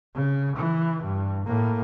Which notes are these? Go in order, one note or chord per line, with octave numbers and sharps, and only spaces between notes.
C#3
E3
G2
A2 A#3